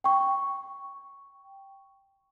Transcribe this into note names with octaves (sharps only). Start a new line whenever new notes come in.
G5 C#6